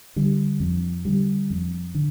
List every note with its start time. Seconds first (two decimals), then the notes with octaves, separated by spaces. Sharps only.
0.16 D3 G3
0.60 F2
1.05 D3 G3
1.50 F2
1.95 D3